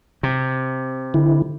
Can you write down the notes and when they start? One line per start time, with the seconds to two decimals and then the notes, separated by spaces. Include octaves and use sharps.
0.23 C3
1.14 D3 E4